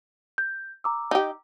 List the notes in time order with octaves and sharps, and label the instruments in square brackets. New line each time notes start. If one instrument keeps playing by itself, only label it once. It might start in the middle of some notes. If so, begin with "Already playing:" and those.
[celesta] G6
A#5 D6 E6
[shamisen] D#4 G4